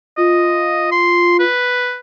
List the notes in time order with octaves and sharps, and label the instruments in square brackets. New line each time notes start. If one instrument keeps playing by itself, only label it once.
[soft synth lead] F4 [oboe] D#5
[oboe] C6
B4